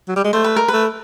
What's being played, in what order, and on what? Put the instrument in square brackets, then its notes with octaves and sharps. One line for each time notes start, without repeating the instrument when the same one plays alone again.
[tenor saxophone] F#3
G3
G#3
[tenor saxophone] A3 [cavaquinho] C5
[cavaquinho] B4
A#4
[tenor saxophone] A3 [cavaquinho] B4